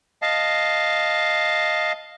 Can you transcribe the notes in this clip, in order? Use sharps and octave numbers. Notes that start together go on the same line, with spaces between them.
D#5 F5 A5